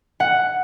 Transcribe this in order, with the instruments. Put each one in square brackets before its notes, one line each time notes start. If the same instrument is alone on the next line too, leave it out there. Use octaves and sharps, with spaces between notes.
[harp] F#5